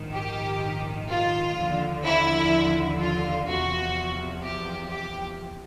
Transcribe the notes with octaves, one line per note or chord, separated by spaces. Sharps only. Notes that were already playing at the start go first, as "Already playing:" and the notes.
Already playing: A#1 G#2 D#3
G4
F4
D#2 D3 F3
E4
F4
E2 C3 F3 F#4
G4
G4